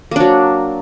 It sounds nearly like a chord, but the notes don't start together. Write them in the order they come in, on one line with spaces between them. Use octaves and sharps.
A#3 D4 F#3